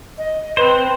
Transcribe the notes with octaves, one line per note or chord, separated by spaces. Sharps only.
D#5
C4 B4 C5